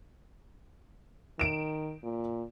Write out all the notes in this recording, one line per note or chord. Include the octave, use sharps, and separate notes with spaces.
D#3 D7 E7
A#2